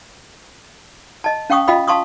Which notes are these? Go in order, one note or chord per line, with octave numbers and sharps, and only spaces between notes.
D#5 A5
C#4 F5 G5 C#6 D#6
F4 D#5 F5 G5 B5 D#6
F5 A5 C6 C#6 D#6